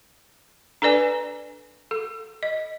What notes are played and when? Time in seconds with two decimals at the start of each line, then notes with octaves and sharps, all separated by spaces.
0.82 D4 A4 B4 D5 G#5
1.91 A4
2.43 D#5